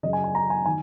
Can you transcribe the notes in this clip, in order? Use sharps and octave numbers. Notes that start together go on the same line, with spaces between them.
F#2 C#3 D#5
G#5
G#5
A#5
G#5
D#3 G#5